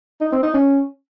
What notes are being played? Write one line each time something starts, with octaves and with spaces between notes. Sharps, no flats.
D#4
C4
D#4
C#4